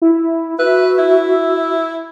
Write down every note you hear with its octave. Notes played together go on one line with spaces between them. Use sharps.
E4
F#4 B4 E5
E4